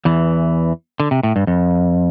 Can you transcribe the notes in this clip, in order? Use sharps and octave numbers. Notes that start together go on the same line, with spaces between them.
E2 E3
D3
C3
A2
G2
F2